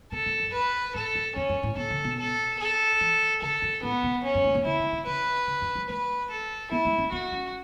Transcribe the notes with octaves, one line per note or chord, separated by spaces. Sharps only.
B2 A4
A2
F#2
B4
A2 A4
F#2
E2 C#4
F#2
A2
B2 A4
C#3
B2
A4
A4
E3
C#3 A4
F#2
A2 B3
B2
C#4
F#2
A2
B2
C#3 E4
C#3
B2
C#3 B4
C#3
F#2
F#3
A3 B4
A4
B3 E4
A3
C#4
B3 F#4
C#4